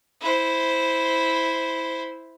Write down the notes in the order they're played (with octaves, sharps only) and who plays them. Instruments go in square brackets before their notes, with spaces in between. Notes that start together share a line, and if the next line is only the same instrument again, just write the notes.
[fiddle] E4 C5